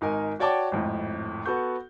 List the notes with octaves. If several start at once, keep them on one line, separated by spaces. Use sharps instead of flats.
G#1 D#4 A#4 G#5
F#4 C#5 D5 G5 A5 D6
G#1 F2 A2
B3 F#4 A4 C#6 G6